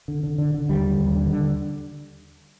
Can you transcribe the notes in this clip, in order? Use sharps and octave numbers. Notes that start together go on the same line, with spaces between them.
D3
D3
D3
D3
D#2 G3
D3
D#2
D3
D3